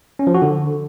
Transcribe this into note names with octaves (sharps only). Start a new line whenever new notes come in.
C#4
F3
F#4
D3